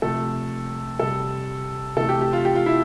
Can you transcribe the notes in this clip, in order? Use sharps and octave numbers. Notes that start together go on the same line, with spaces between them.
C3 F3 A3 A4
C3 G3 A4
C3 E3 A3 A4
G4
G4
F4
G4
F4
E4